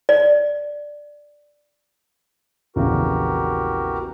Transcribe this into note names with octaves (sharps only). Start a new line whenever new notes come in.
D5
A#1 E2 C#3 F#4 G4 A#4